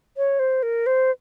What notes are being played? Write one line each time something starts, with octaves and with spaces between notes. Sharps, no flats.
C#5
C5
A#4
C5